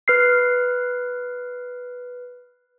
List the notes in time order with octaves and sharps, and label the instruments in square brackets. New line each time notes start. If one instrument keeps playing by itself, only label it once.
[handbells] B4 F6 C7